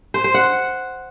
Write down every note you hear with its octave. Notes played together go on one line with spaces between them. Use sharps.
C5
C5
F#5